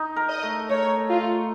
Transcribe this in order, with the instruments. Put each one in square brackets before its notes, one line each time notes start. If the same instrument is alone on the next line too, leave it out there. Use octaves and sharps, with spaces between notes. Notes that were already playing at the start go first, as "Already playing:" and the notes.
Already playing: [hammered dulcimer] D#4
A#4
[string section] D#5
[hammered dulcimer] A3
[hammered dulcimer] A3 [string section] C#5
[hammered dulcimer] A#4
[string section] F4
[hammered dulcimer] A3